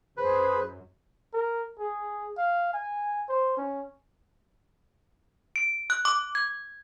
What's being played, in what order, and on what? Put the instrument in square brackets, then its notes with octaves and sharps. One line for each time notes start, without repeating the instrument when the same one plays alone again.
[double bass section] F#2 [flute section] G#4 C5 [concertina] B4
[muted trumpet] A#4
G#4
F5
G#5
C5
C#4
[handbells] D7
F#6
D6
G#6